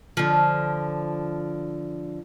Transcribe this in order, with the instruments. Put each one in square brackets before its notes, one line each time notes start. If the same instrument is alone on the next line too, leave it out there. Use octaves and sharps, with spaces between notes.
[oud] D3 F3